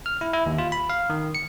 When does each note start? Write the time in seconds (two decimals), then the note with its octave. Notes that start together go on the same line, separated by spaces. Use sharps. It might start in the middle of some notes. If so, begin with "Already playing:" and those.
0.06 F6
0.21 E4
0.33 E4
0.46 D#2
0.58 F4
0.72 B5
0.90 F5
1.10 D#3
1.35 C#7